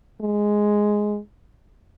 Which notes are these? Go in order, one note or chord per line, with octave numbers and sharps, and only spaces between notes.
G#3